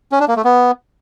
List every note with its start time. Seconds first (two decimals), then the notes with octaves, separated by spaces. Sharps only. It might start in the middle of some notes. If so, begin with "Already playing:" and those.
0.12 C#4
0.20 D4
0.28 A#3
0.36 A3
0.45 B3